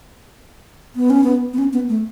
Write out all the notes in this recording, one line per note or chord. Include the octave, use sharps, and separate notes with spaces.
B3
C#4
B3
B3
C#4
B3
A3